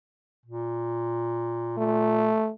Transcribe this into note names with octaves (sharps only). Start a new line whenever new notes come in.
A#2
A#2 A3